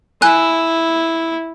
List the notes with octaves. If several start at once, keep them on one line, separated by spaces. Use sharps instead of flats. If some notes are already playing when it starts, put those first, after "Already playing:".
E4 G#5 F#6